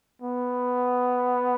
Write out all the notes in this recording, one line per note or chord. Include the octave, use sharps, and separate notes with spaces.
B3